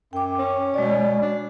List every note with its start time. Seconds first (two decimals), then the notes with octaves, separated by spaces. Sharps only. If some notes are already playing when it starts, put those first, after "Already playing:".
0.13 F#2 G5 D6
0.39 C#4
0.74 B2 G#3 C#5 D5
1.22 D4